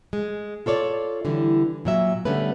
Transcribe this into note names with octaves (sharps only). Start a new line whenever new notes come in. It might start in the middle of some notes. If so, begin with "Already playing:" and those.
G#3
F4 A4 C#5 D5
D3 E3 G3
A#2 F#3 E5
D3 G3 A3 B3 C#4 B4